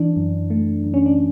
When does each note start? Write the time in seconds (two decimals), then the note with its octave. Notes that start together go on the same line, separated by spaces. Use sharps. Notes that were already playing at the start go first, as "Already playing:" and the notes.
Already playing: E3 D4
0.17 F#2
0.50 A3
0.84 F#2
0.94 C#4
1.06 D4